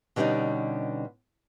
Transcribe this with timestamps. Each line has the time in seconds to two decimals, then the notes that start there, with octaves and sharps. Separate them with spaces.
0.16 B2 D3 G3 B3 C#4 D#4